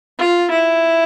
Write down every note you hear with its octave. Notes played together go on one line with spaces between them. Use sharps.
F4
E4